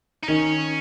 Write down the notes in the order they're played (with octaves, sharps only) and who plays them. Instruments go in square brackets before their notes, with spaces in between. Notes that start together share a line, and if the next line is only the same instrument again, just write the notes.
[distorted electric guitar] D#4
[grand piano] D#3 [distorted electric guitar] C#4